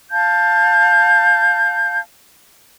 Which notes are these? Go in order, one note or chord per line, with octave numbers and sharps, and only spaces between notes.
F5 A5 G6